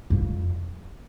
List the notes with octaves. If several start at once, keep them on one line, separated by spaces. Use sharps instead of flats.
F2